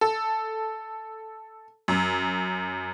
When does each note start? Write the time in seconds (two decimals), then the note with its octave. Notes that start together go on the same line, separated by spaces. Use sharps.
0.01 A4
1.88 F#2